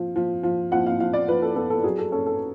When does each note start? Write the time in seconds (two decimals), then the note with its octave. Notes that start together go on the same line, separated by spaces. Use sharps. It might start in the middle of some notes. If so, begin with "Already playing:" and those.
Already playing: F3
0.16 F3
0.43 F3
0.72 F3 F#5
0.86 F5
1.00 F3 F5
1.14 D5
1.28 F3 B4
1.42 A4
1.56 B3 A4
1.70 A4
1.84 F#3 G#4
1.98 A4
2.12 C#4 A4
2.26 A4